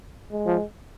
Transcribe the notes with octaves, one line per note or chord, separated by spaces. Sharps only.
G#3
F3